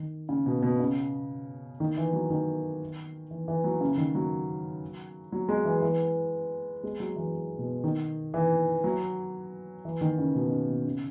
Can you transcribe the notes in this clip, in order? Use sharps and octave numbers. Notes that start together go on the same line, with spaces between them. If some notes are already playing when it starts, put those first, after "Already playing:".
Already playing: D#3
C#3
B2
B2
C#3
D#3
E3
F#3
D#3
E3
E3
F#3
C#3
D#3
F#3
F#3
G#3
E3
E3
G#3
F#3
E3
B2
D#3
E3
F#3
E3
D#3
C#3
B2
C#3
B2
C#3